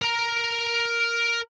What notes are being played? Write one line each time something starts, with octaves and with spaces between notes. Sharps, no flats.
A#4 A#5